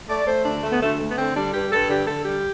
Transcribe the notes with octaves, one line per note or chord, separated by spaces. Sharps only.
A3 D5
A3 C5
D2 D4
A3
B3
D2 A3
A3
B3
D3 C4
G3 D4
G2 G4
G2 A4
D3 G4
D3 A4
G3 G4